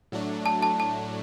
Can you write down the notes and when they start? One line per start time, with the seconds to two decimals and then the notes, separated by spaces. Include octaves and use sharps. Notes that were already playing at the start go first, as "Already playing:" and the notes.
0.12 A2 F#3 A3 D4
0.46 A5
0.62 A5
0.80 A5